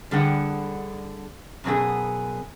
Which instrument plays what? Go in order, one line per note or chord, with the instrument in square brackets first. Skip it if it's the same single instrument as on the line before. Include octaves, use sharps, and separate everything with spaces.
[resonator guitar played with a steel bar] D3 G3 G#4 B4 F#5 G5
F#2 B2 B3 G#4